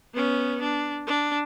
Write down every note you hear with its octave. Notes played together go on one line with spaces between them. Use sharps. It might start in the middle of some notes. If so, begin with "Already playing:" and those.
B3 C#4
D4
D4